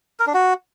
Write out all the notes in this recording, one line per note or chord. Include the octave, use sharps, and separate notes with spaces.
A#4
D4
F#4